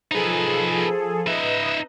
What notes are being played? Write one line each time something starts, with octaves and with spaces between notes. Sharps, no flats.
F3 D#4 G#4 A4 B4
D#4 B4 D#5 E5